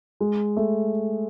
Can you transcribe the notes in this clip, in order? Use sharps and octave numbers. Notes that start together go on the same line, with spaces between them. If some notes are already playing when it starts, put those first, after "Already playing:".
G#3
A3